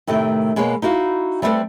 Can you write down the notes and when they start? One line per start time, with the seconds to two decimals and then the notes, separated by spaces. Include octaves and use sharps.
0.07 A2 C3 D#3 A3
0.56 B2 G#3 A#3 B4 C#5
0.82 D#4 E4 F#4 F5
1.42 G3 A3 C4 F4 A4 B4